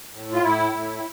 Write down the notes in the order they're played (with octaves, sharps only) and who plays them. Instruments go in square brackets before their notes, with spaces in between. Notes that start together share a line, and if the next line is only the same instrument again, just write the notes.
[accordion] A2
F4
A2 E4
A2